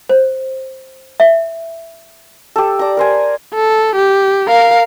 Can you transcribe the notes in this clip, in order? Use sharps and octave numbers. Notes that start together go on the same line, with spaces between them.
C5
E5
G4 A4
D5 A#5
A#4 C5 G#5
A4
G4
A#4 F5